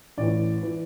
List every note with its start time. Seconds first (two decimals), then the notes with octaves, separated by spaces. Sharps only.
0.18 A1 A2 E3 D5
0.63 E3